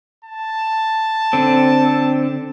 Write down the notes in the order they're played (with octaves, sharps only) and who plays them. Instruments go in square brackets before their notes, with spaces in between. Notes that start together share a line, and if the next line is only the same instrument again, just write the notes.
[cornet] A5
[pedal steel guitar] D3 C4